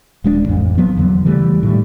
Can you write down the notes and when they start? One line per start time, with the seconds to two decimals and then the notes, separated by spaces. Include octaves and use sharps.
0.24 D#1 G#3 B3 D4
0.45 A1 F2
0.78 F3 F#3 B3
0.97 E2 D3 F#3
1.25 C#3 E3 G3 A3
1.63 A2 D#3 G3